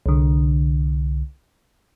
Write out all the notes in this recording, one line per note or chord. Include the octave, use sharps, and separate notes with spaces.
C2 D3